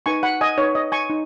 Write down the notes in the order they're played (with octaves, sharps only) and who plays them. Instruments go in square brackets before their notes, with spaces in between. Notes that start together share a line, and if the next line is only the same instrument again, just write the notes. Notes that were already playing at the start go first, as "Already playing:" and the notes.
[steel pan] D#4 B4 G#5 C#6
F#5 B5
D#5 G#5
D#4 B4 C#5
D#5
G#5 C#6
D#4